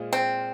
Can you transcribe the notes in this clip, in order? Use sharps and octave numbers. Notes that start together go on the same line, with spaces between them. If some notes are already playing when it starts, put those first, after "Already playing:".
Already playing: A#2 G#3 F4 G#4 C5
C4